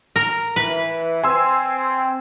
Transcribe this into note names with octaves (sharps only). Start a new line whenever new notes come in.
A#4
E3 B4
C4 G#5 C6 E6